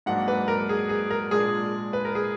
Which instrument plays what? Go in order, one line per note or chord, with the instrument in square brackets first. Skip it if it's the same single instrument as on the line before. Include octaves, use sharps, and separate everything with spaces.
[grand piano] G#2 F#3 A#3 D4 F#5
B4
A#4
G#4
G#4
A#4
A#2 G#3 D4 G#4
B4
A#4
G#4